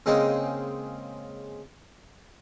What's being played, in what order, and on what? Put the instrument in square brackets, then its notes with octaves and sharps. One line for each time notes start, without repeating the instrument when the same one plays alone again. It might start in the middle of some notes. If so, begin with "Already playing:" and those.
[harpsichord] C#3 G#3 A#3 C4 D#4